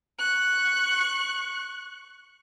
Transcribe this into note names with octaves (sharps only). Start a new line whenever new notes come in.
C#6 F#6